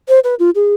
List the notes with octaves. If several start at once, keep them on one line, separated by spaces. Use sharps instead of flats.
C5
B4
F4
G#4